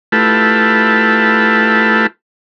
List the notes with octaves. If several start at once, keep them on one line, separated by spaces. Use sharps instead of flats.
A3 E4 F4 G4 A4 B4